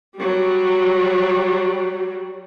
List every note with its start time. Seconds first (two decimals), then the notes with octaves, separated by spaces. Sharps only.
0.16 F#3 G3